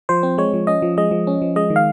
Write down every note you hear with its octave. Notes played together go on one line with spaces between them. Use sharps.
F3 C5
C4
G#3 C#5
F3
C#4 D#5
F3
G#3 D#5
F3
C#4
F3
G#3 D#5
D#3
F5